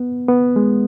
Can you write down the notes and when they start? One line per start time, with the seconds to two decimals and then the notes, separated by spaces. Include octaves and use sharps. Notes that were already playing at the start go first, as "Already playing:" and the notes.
Already playing: B3
0.28 B3
0.56 G#3